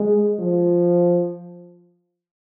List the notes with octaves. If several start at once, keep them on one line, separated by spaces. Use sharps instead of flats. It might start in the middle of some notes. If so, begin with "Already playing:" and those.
Already playing: G#3
F3